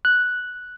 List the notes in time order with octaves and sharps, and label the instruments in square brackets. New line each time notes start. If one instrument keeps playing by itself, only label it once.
[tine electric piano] F#6